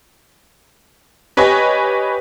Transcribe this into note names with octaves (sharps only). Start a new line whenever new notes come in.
G4 B4 C#5 D#5 G#5